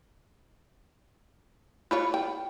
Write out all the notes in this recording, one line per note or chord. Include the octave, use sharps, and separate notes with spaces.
E4 F4 C#5
G5